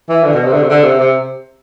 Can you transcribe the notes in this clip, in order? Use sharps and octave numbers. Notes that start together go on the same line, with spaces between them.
E3
D3
B2
C3
D3
C3
D3
C3
C3